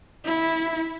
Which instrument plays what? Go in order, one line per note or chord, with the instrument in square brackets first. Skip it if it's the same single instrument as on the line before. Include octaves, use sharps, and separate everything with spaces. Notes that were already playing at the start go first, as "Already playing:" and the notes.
[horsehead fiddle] E4